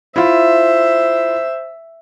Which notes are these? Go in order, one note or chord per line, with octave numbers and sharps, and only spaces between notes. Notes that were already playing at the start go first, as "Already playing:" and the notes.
E4 F4 C5 E5